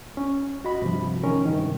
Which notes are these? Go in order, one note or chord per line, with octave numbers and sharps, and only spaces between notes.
C#4
F#4 D#5 B5
G2 C3 F3
D#3 G#3 C#4 A#4
G2 C3 D#3